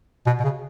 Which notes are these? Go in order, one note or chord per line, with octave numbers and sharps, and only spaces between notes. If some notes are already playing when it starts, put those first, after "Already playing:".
B2
B2
C#3